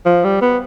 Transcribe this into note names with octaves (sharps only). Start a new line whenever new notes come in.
F3
G3
B3